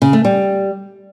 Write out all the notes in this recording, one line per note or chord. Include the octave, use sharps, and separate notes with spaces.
C#3
A3
G3